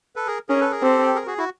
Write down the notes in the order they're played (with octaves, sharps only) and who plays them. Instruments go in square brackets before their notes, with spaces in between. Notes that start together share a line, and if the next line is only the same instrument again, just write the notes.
[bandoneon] A4 B4
G#4 A#4
[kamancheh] C#4 [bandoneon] G#4 A#4
[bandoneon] A4 B4
G#4 A#4
[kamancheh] C4 [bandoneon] G4 A4
[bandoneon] G#4 A#4
F#4 G#4
E4 F#4